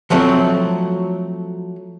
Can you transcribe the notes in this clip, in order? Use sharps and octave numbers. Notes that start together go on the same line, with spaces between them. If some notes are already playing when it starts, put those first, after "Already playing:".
F3 F#3 A3 C4